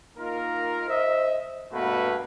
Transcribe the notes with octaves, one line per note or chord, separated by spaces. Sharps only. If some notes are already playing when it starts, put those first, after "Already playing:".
A#3 D#4 F4 A#4
C5 D#5 E5
G2 B2 A3 A#3 F#4 B4